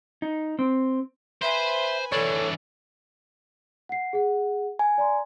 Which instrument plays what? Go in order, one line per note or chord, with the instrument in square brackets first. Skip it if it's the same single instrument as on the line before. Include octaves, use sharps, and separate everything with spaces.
[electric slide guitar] D#4
C4
[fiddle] B4 G#5 [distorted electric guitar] C5 [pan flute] E5
[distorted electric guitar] E3 D4 [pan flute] A4 [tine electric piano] C#5
[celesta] F#5 C7
G#4 F#5
[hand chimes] G#5
[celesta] D5 A#5 C6